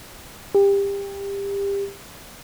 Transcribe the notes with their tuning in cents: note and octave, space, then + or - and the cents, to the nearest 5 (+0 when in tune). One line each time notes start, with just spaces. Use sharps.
G4 +25